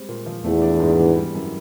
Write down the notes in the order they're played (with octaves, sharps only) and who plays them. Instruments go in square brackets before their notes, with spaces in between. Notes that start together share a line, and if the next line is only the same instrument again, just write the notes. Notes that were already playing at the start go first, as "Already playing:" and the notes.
Already playing: [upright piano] G3 G#3 C4
A#2
F3
[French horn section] E2 [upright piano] A3
[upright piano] D4
G#2
E3
G3
F#2